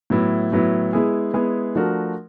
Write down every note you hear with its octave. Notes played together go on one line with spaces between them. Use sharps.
A2 F#3 B3 E4
A2 F#3 B3 E4
G#3 B3 E4 G#4
G#3 B3 E4 G#4
F3 A3 D4 F#4 A#4